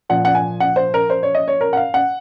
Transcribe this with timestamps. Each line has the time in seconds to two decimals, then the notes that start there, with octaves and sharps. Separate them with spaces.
0.09 A#2 F3 F#5
0.25 F#5
0.35 G#5
0.60 F#5
0.76 C5
0.94 A#4
1.10 C5
1.23 C#5
1.35 D#5
1.48 C#5
1.61 A#4
1.73 F#5
1.77 F5
1.94 F#5